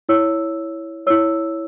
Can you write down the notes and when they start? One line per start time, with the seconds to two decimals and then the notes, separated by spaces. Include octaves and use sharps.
0.09 E4 C#5 E6
1.07 E4 C#5 E6